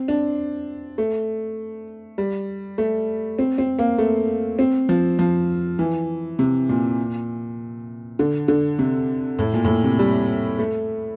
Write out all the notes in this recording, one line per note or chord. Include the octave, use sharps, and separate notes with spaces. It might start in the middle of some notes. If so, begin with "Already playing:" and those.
Already playing: C4
D4
A3
G3
A3
C4
C4
A#3
A3
C4
F3
F3
E3
C3
A#2
D3
D3
C3
A2
A#2
A2
A#2
C3
G3
A3